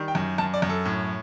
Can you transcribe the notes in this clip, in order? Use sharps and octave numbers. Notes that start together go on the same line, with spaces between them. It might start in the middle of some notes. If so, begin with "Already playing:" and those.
Already playing: D#3 G3
G5
F#2
F#2 A5
D5
F#2
A4
A2